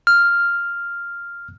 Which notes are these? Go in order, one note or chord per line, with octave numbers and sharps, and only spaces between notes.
F6